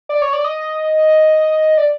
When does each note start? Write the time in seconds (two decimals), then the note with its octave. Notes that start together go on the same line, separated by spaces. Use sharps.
0.09 D5
0.22 C#5
0.33 D5
0.44 D#5
1.78 D5